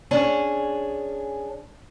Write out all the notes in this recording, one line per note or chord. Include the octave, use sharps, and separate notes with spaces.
C#4 D4 G#4